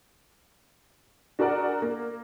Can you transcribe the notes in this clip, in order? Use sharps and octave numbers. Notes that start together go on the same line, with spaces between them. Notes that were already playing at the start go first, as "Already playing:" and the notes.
D4 F#4 G#4 A#4 D5 F#5
A#3